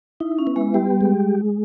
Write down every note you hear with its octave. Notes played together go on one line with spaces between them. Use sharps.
D#4 E4
C#4
B3
G#3
G3 G4
G#3